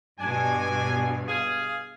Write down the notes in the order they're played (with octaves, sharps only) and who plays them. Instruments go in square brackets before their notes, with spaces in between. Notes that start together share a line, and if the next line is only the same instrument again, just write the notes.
[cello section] G2 B2 [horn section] D4 G#5
[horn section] G#4 F5